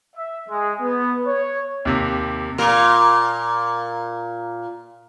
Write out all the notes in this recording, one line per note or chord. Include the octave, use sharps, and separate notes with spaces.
E5
G#3
B3
C#5
D#2 C3
A#2 A#4